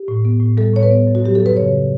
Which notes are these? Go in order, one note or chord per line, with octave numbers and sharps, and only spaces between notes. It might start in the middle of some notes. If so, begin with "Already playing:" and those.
Already playing: G4
A2
B3
A2
G3 A4
A2 C#5
B4
B3
F#2
F#4
F#3 G4
F#2 A4
B4
C#3 C#5